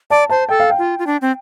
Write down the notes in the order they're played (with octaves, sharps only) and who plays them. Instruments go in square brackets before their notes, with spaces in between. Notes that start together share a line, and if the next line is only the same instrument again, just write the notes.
[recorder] D5 [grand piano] A5
[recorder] C5 [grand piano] A5
[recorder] A4 [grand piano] G5
[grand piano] F5
G5
[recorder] F4
F4
D4
C4